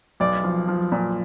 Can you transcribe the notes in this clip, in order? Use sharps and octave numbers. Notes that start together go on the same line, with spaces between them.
B1 D5
F3
F3
A#2